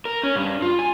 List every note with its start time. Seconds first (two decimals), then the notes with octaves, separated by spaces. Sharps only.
0.05 A#4
0.23 C#4
0.36 G2
0.62 F4
0.79 G#5